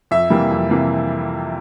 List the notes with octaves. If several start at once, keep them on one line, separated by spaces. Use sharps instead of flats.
F2 E5
C3 E3 G3 A#3
F2
C3 E3 G3 A#3